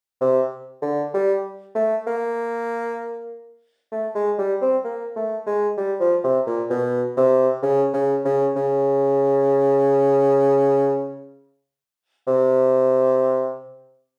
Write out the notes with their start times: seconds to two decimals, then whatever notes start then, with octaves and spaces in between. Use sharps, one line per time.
0.21 C3
0.82 D3
1.14 G3
1.75 A3
2.07 A#3
3.92 A3
4.15 G#3
4.38 G3
4.61 C4
4.84 A#3
5.16 A3
5.46 G#3
5.77 G3
6.00 F3
6.24 C3
6.47 A#2
6.70 B2
7.17 C3
7.62 C#3
7.93 C#3
8.25 C#3
8.56 C#3
12.27 C3